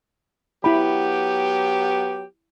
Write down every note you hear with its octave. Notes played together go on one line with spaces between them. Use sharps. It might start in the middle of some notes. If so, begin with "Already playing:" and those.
F#3 B3 E4 G4 B5